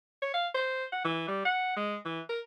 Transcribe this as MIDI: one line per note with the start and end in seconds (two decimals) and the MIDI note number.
0.22 0.32 73
0.34 0.48 77
0.54 0.85 72
0.92 1.01 78
1.05 1.27 52
1.28 1.41 55
1.45 1.74 78
1.76 1.96 56
2.05 2.20 52
2.29 2.40 70